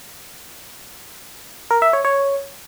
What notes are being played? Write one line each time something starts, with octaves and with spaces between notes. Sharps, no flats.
A#4
E5
C#5
C#5